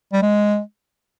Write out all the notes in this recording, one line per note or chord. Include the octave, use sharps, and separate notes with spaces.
G3
G#3